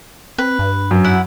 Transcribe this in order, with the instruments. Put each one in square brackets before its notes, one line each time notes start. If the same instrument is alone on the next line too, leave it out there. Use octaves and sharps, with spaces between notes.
[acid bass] C4 [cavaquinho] B4
[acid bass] G2
[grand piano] F#2
[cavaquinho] E4 F#5 B5